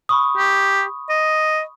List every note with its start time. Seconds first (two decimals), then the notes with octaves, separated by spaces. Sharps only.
0.09 B5 C#6 D#6
0.37 G4
1.10 D#5